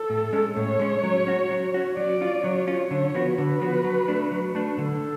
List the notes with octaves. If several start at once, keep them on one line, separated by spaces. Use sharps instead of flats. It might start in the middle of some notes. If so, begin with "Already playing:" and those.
Already playing: A4
A2
G#3 C#4
A2 C#5
G#3 C#4
F#3
C#4 F#4
F#3
C#4 F#4
F#3 D5
C#4 F4
F#3 C#5
C#4 F4
D3
F3 B3 F#4
D3 B4
F3 B3 F#4
F#3
A3 D4
F#3
A3 D4
D3 A4